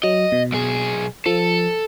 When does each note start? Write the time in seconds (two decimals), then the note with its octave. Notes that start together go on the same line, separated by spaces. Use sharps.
0.03 F#3 D#5
0.32 B2
0.52 B1 G#4
1.26 F3 A4